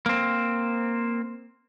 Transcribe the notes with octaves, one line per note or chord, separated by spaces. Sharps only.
A#3 C4